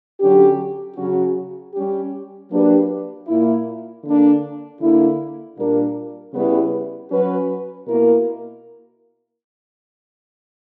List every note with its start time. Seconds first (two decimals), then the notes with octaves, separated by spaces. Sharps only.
0.20 D3 F#3 C#4 G4
0.97 C#3 F#3 C#4 F#4
1.73 G3 C#4 G4
2.50 F#3 A#3 D4 G4 B4
3.27 A#2 A#3 E4
4.04 D3 A#3 D4
4.80 D3 A#3 E4
5.57 A#2 G3 A#3 D4 A#4
6.33 C#3 G3 B3 E4 B4
7.10 F#3 C#4 F#4 B4
7.87 B2 A#3 E4 A#4